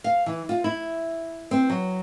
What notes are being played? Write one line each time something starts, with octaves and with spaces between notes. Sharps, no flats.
F5
E3
F4
E4
C4
F#3